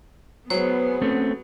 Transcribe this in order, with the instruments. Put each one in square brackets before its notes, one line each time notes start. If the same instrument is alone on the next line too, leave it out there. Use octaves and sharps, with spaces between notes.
[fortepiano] F#3 [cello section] B3 G#4 [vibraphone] C5
[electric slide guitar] A3 C4 C#4